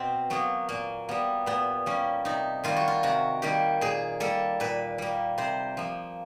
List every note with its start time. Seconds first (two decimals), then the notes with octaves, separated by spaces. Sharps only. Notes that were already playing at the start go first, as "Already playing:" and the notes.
Already playing: B2 C4
0.30 F#3 A#3 B3
0.69 A#2 A#3
1.09 G3 A#3 B3
1.46 A#2 B3
1.86 G3 A#3 C#4
2.25 C3 D#4
2.64 D#3 G3 A#3 F4
2.76 F#4
2.88 F4
3.03 C3 F#4
3.42 D#3 G3 A#3 G4
3.81 A#2 G#4
4.20 G3 A#3 A4
4.60 A#2 B4
4.98 G3 A#3
5.38 C3 C5
5.77 F3 A#3